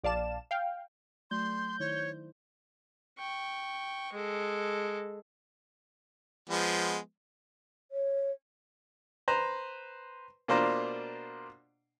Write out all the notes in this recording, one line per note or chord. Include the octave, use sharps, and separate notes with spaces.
A#1 D5 F5 A5 E7
F5 G5
F#3 A3 D5 C6 G6
D#3 E4 C5 C#5
G5 C#6
G#3 A4
F3 G#3 B3
C#5
B4 C5 A#5
B2 A#3 D4 F4 C5 A#5